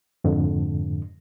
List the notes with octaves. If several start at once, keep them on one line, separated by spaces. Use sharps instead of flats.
F2 G#2 D3